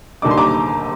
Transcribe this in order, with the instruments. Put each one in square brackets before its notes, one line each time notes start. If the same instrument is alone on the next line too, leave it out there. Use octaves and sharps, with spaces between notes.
[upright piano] D#2 D3 G3 A#3 D#4 D6
C6
A#5 D6